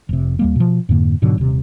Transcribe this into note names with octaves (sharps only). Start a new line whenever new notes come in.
F1 C3
D#2 G3 A#3
B2 F3
F2 G#2 D3 A#3
G#2 B2 D3 F#3
D#1 C3